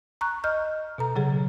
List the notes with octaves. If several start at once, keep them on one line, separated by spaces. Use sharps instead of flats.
A#5 C#6 F#6
D#5 F6 G6
B2 A4 A#5
C#3 F#3 G#4